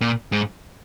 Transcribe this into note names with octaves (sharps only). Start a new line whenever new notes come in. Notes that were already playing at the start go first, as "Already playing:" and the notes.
A#2
G#2